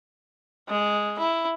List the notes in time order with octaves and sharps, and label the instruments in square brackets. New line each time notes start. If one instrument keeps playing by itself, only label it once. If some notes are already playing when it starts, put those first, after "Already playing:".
[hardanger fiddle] G#3
E4